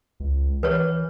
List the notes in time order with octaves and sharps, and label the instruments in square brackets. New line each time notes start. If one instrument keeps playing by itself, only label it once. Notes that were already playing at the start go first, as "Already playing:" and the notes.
[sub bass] C#2
[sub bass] E3 [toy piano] B4 C#5